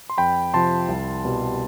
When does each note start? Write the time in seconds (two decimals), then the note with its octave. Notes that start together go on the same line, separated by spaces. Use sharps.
0.10 C6
0.18 F2 G5 B5
0.54 C3 F3 A5 C6
0.88 C2
1.25 B2 G3